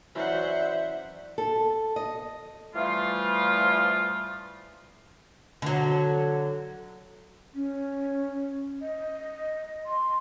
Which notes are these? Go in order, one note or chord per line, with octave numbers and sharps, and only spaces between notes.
E3 F#3 C#4 C5 D5 E5 F#5
A4
D#5
E3 F3 G3 A3 F4
D3 F#3
C#4
D#5
C6